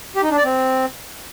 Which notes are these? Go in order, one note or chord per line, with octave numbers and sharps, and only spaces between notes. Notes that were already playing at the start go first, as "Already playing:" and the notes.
G4
D#4
D4
D5
C4